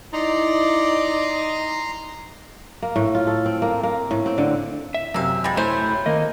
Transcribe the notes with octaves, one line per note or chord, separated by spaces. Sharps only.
D#4 E4 D5 A#5 C6
A#3
A2
F4
A4
C4
A#3
A#3
A2
C4
D3
E5
F#2 C3 A#3 F5 E6
G3 G#3 B5
A3 E4 C5 C#5
D#3 A#3 D#5